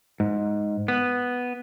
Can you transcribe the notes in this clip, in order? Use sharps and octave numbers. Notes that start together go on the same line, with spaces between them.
G#2
B3